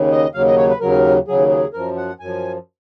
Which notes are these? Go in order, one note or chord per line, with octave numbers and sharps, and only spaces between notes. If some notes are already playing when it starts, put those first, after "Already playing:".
Already playing: D#2 C#3
D#5
D#2 C#3 F#3 F5
D#5
C#5
B4
D#2 C#3 F#3 A#4
D#2 C#3 F#3 G#4
G#4
F#2 F3 A#4
F#5
F#2 G#5
F3